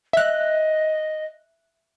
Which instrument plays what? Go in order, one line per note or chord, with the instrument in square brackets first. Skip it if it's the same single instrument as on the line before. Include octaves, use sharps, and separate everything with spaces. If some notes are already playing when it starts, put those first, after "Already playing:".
[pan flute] D#5 [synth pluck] E5 F#6